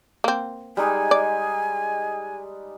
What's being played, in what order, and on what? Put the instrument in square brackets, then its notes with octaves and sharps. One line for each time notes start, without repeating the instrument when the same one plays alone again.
[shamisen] A#3 C4
[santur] G3 G#3 D#4 [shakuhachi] G#5
[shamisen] D5